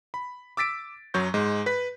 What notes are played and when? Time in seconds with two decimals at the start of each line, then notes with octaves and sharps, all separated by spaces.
0.14 B5
0.57 D6 E6 A6 B6 D7
1.14 F#2 F#3 C#6 G6
1.34 G#2 G#3
1.66 B4 B6